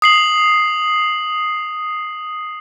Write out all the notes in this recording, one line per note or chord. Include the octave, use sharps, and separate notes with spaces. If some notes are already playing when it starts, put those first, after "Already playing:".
D#6 C7 F#7